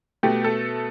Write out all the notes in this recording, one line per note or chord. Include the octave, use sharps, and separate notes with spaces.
B2 A3 G4
A4